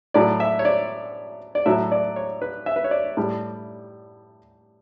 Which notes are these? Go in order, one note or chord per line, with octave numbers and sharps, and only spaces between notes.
A2 F#3 D5
E5
C#5
D5
D5
A2 F#3 E5
D5
C#5
B4
E5
B4
C#5
D5
A2 G3